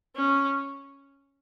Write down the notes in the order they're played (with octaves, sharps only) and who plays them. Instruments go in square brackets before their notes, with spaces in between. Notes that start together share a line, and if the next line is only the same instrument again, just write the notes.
[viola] C#4